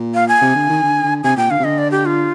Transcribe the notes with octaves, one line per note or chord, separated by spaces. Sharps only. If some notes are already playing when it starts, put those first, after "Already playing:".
Already playing: A#2
F5
G#5
C3
D3
D#3
D3
D3
C3 G#5
A#2 G5
D3 F5
C3
D3 D#5
D5
G4
F4